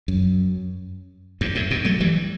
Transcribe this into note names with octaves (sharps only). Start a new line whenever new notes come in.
F#2
E2 G2
F#2 A2
G2 B2
F#3 A3
E3 G3